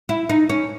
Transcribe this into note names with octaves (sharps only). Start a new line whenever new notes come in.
E4
D#4
C#4